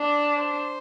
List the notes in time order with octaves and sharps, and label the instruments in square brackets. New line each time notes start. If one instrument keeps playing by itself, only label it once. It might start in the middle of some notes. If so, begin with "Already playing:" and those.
Already playing: [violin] D4 [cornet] D5
[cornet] C5